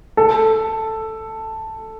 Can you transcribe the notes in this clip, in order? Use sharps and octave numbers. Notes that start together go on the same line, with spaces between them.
A4